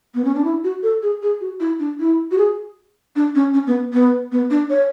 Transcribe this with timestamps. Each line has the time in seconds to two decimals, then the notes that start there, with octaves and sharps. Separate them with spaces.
0.15 B3
0.25 C#4
0.35 D4
0.44 E4
0.64 F#4
0.83 A4
1.03 G#4
1.22 G#4
1.41 F#4
1.60 E4
1.80 D4
2.00 E4
2.31 F#4
2.38 G#4
3.16 D4
3.35 C#4
3.54 C#4
3.67 B3
3.93 B3
4.32 B3
4.51 D4
4.70 C#5